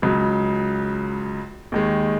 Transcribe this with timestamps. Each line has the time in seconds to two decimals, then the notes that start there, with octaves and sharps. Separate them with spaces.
0.02 C#2 C#3 F#3
1.72 D#2 D#3 G#3